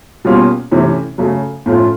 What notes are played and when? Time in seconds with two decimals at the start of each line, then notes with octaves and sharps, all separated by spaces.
0.25 B2 G3 A#3 C#4 F4
0.71 C3 E3 A3 C#4
1.18 C#3 F#3 A3
1.66 A2 F3 A3 C#4 F4